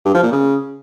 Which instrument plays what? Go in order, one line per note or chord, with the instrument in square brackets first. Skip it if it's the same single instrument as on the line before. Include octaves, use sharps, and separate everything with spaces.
[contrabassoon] G2
F3
A#2
C#3